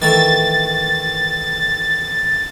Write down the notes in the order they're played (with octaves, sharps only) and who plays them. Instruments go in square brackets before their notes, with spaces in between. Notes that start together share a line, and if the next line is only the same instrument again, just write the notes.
[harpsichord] D#3 E3 A3 [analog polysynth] A6